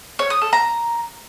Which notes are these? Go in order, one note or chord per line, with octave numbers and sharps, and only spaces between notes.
C#5
D#6
A4
A#5